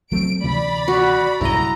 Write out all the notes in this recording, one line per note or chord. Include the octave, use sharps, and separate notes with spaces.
F#3 A3 C4 D7
D2 C3 E3 D5 B5
F#4
B1 G2 C#3 E4 D#5 A#5